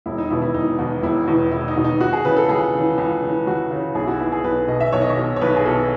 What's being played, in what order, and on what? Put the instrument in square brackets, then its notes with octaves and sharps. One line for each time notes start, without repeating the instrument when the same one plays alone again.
[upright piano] E1 E4
D#4
E2 B2 E4
E4
E1 D#4
E2 B2
E1 E4
E2 B2
E1 E4
D#4
E2 B2
D#4
C#2 F#4
G#4
C#3 E3 B4
A4
C#2 G#4
C#3 E3
C#2
C#3 E3
C#2 F#4
C#3 E3
B1 G#4
E4
F#4
B2 E4
G#4
B1 B4
B2 D#5
E5
B1 C#5
D#5
C#5
B2
C#5
B1 B4
G#4
B2 A4